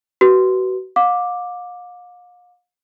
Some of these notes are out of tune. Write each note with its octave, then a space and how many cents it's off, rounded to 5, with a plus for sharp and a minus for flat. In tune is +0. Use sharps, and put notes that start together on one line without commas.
F#4 +30 B4 -5
F5 +40 D6 +0